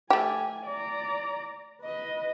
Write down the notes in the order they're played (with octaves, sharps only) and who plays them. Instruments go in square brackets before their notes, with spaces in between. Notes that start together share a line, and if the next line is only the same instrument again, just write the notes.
[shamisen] A3 G4 [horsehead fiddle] G#5
[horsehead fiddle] D5 A#5
B4 D#5